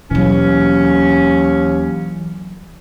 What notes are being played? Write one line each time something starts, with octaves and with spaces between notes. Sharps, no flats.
D#2 B2 E3 F#3 C#4